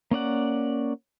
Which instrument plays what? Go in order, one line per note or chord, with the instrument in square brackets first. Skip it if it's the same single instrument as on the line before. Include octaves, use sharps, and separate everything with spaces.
[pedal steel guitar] A#3 C#4 D5 F#5